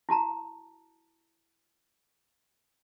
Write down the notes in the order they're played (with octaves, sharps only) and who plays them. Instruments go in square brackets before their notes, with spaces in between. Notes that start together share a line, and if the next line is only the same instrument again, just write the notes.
[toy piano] E4 F#4 A5 A#5